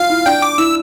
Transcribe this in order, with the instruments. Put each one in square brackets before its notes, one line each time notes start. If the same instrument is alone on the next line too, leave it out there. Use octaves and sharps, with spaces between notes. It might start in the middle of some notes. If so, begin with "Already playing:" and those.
Already playing: [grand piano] F4 [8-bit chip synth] F5
[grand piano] E4
[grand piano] D4 [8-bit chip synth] G5
[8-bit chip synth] D6
[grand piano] E4 [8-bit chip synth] E6